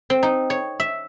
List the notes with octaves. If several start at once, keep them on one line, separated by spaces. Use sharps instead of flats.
C4
D#4
C#5
E5